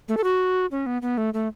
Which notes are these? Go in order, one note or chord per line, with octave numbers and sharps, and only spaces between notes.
A3
A4
F#4
C#4
B3
B3
A3
A3